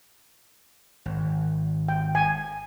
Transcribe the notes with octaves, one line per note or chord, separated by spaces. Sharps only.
G#1
G5
G#5